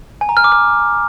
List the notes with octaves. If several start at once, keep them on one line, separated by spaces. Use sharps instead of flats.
G#5
A#5
F6
D6
F6